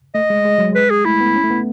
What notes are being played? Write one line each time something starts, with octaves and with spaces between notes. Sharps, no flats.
A3 D#5
G#3
G#3
F#3
G#3 B4
G#4
A3 E4
B3
C#4
A3
B3